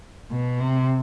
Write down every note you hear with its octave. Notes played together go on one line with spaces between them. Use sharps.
B2
C3